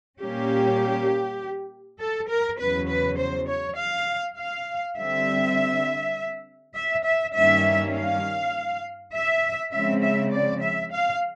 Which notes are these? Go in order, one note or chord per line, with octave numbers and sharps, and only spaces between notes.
A#2 G3 A#3 C#4 G4
A4
A#4
E2 C#3 F#3 B4
B4
C5
C#5
F5
F5
D3 G3 C4 E5
E5
E5
G2 D#3 G3 A#3 C#4 E5
F5
E5
C#3 F3 G#3 C4 E5
E5
D5
E5
F5